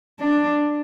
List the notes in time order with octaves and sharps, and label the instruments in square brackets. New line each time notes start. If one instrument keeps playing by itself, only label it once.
[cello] D4